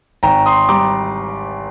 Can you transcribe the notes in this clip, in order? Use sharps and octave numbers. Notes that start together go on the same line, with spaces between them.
G#1 G5 A#5
C6 D#6
G3 A#5 D6